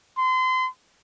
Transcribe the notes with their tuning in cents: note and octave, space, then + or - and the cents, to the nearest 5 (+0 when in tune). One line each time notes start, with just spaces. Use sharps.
C6 -30